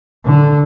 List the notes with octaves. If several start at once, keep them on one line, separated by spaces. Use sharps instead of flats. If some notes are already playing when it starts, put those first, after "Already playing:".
D3